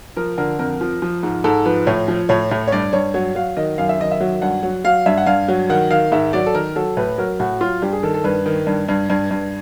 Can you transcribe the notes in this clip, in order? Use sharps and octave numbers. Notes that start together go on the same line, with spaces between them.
F3 A#4
D3 A#4
F2 A#4
F3
F3
G#2
G#2 A4
F3 B4
A2 C#5
F3
A2 C#5
A2
C#5
G2 D5
G2 C#5
F#3 C#5
F#3 F5
D#3 D#5
F#2 F5
E5
D#3 D#5
E5
F#3
G2 F#5
F#3
F#3 F5
G2 E5
F#5
G2 F5
F#3
D#3 F#5
D#3 F5
G#2 E5
F#3 D5
A4
D#3 A#4
F#3 A4
A2 B4
F#3 A#4
A2 F#4
F#3 F4
G2 G4
G#4
D#3 A4
A4
G2 B4
D#3
G2
G2
G2
G2